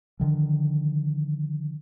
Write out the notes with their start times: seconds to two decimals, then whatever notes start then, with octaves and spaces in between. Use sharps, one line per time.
0.20 D3 D#3 F3